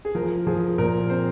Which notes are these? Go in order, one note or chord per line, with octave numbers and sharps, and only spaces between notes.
G#4
F3 A#4
F3 G#4
A#2 A#4
C4 C5